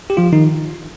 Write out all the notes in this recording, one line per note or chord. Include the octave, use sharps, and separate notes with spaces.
G4
F3 F4
D#3 D#4